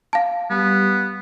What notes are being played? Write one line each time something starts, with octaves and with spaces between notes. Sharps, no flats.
F5 A5
G3 B3